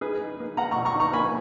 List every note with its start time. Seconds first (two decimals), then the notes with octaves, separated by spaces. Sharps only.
0.01 D#4 G#4 B4
0.21 D#4
0.40 A#3
0.57 A#3 F#5 A#5
0.71 A#2 A#5 C#6
0.85 A#5 C#6
0.95 D#4 A#5 C#6
1.13 A#3 G#5 B5